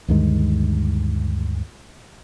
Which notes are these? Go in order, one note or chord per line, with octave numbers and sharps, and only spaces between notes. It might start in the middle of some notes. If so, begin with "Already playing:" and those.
D2 G2 D#3 G#3